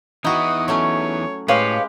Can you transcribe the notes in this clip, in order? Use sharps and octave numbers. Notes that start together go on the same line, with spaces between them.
E3 B3 D#4 E4 F#4 D#6
F#3 A3 C#4 C#5
A2 G#3 G4 B4 C#5 F5